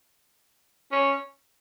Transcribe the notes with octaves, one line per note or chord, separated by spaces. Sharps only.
C#4